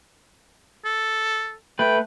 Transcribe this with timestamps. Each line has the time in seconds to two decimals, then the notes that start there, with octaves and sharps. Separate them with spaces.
0.85 A4
1.79 A3 B4 G5